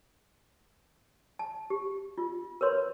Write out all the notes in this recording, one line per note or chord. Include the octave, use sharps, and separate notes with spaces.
A5
G4
F4
A#4 B4 C#5 C6